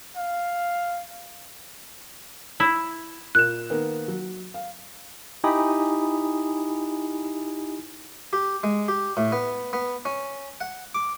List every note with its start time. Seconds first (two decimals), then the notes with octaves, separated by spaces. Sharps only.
0.17 F5
2.60 E4
3.35 A#2 A#3 F#6 E7
3.70 D#3 A#3 B3
4.08 F#3
4.54 F5
5.44 D#4 E4 G4 G#5 B5 D#6
8.33 G4
8.63 G#3
8.88 G4
9.17 A2
9.32 B3
9.73 B3
10.05 C#4
10.61 F#5
10.95 D6